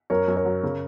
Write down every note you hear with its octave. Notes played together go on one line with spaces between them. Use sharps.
F#2 A#4 C#5
F#2
A#4 C#5
F#3
C#3